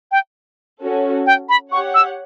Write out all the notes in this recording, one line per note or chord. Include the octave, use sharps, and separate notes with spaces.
G5
C#4 F#4 A4
G5
B5
G4 C#5 F#5 C#6
E6